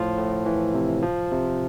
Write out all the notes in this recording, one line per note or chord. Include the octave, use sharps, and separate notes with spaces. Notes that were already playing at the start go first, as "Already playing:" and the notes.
Already playing: A2 F3 F4
A2
E3
C3
F3
C3